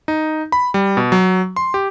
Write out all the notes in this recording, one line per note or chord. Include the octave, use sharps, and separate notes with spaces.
D#4
B5
G3
B2
F#3
C6
G4